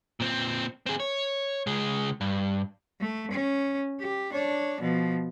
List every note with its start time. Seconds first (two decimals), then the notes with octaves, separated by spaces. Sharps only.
0.20 A#2 C4
0.86 C4 G#4
1.00 C#5
1.67 C#2 G#3
2.21 G2
3.00 A3
3.31 C#4
4.00 G4
4.33 D4 C#5
4.81 B2 F3